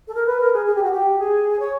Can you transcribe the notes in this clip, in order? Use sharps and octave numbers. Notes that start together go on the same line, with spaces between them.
A4
A#4
B4
A#4
G#4
G#4
G4
F#4
G4
G#4
C#5